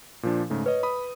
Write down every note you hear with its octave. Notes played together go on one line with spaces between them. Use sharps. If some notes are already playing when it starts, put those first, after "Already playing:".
A#2 F3 D4
G#2 C#3 A3
B4 C#5 D#5
B5 D#6